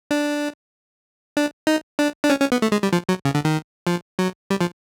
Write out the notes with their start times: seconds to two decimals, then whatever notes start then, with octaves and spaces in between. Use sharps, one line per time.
0.11 D4
1.37 D4
1.67 D#4
1.99 D4
2.24 D4
2.30 C#4
2.40 C#4
2.52 B3
2.62 A3
2.72 G#3
2.83 G3
2.93 F3
3.09 F#3
3.25 C#3
3.35 D3
3.45 D#3
3.87 F3
4.19 F#3
4.50 G3
4.61 F3